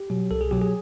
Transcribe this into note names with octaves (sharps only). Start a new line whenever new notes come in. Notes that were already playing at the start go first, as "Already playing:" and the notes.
Already playing: G4
B2 F#3
C2 A4
G#4
B2 F#3 G4
G#4